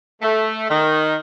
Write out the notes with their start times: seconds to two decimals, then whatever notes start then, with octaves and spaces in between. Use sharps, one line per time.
0.22 A3
0.70 D#3